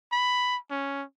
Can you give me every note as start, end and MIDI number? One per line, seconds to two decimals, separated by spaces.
0.12 0.57 83
0.70 1.03 61